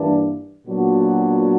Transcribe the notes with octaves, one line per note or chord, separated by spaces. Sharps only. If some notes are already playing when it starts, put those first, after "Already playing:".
Already playing: G2 E3 A#3 D4
A#2 F#3 B3 D4 F#4